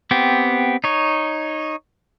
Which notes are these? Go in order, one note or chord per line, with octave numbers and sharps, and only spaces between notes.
B3 C4 G4
D#4 C#5